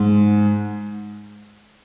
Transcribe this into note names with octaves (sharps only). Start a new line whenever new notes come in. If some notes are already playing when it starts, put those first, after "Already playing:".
Already playing: G#2